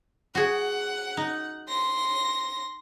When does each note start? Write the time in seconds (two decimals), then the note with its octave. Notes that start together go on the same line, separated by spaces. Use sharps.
0.35 F#4 G#4 F#5
1.17 D#4
1.69 C6 A#6